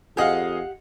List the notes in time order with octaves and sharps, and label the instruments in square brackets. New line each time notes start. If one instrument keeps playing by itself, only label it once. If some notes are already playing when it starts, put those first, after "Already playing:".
[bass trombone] F2 [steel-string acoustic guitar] G4 F#5 [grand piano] G#4 D#5 F5